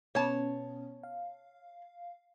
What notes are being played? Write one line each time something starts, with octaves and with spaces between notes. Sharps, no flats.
B2 B3 C#4 C#5 A5
F5